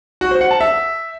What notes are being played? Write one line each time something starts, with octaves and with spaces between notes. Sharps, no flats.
F#4
C5
F#5
A5
E5